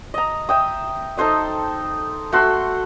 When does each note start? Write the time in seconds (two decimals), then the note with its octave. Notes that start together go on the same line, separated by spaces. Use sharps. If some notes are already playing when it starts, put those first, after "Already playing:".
0.14 D#5 A#5
0.49 E5 G5 D#6
1.17 D#4 A4 C5 D#5
2.32 A3 F#4 C6 E6